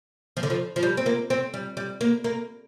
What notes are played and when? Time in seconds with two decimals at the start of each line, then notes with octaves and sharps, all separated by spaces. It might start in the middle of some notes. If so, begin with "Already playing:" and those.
0.37 F3
0.43 D3
0.50 F3
0.76 F3
0.83 G3
0.97 C4
1.06 A#3
1.30 C4
1.54 G3
1.77 G3
2.01 A#3
2.24 A#3